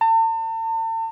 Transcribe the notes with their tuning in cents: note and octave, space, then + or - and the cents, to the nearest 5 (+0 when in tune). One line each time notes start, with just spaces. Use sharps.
A5 +40